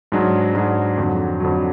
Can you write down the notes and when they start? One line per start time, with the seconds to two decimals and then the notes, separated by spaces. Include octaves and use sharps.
0.12 G#2 F#3 D4 G#4
0.55 G#2 F#3 D4 G#4
0.97 F2 D3 F#3
1.40 F2 D3 F#3